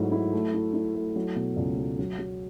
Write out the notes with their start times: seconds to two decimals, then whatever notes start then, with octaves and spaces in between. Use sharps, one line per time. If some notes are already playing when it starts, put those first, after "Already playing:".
Already playing: G#2 F#3 A3 E4
0.12 E4
0.33 A3
0.54 E4
0.74 E4
0.96 A3
1.16 F#3
1.36 B2
1.57 C#2
1.77 F#3
1.99 F#3
2.19 F#3